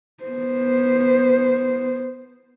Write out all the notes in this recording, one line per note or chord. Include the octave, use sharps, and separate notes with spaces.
B3 C5